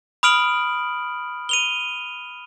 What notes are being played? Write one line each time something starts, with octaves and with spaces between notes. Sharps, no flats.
B5 D#6 F6 D7 F#7
D#7 F7 G7